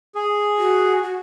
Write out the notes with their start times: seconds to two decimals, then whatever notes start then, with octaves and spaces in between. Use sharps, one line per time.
0.15 G#4
0.58 F#4
1.03 F#4